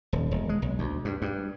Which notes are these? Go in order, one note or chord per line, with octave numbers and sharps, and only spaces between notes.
D#1
E1
G#3
B1
D2
G2
G2